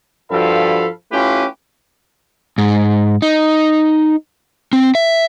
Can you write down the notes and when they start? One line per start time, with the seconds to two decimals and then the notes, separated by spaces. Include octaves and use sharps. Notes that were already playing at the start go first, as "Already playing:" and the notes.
0.30 G2 F3 F#4 A4 F5 B5
1.12 A3 C#4 E4 F4 G4 B4
2.58 G#2
3.22 D#4
4.73 C4
4.95 E5